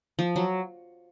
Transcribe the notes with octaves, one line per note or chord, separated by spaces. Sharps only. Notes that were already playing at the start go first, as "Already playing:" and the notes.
F3
F#3